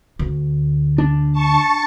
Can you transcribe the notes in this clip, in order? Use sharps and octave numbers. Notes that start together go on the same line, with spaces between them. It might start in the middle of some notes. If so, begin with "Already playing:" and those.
D2
D4
A5 C#6